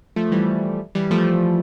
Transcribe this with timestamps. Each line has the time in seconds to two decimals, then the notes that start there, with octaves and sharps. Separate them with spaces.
0.16 F3 A3
0.31 E3 G3
0.95 E3 G3
1.10 F3 A3